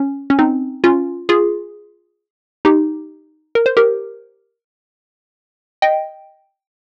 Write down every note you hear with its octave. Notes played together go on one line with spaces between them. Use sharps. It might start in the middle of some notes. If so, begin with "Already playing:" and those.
Already playing: C#4
C#4
C4 D#4
C#4 F4
F4 G#4
D#4 G4
A#4
C5
G4 A#4
D#5 G5